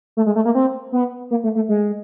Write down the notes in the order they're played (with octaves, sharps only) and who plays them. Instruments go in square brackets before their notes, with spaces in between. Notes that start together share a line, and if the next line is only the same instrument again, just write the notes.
[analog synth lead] A3
G#3
A3
A#3
C4
B3
A#3
A3
A3
G#3